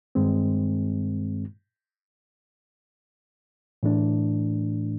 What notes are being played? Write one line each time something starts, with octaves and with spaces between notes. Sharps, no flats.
G2 D#3 G#3 C4
A2 E3 A3 D4